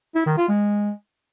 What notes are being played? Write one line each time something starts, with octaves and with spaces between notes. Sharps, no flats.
E4
D#3
F4
G#3